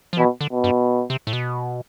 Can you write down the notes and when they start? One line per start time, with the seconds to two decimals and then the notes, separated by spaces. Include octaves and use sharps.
0.13 F3
0.18 B2 E3
0.41 D3
0.52 B2
0.64 G2
1.10 C3
1.27 A2
1.33 B2